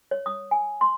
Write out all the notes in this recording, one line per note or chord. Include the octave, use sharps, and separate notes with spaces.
C#5
D#6
G#5
C6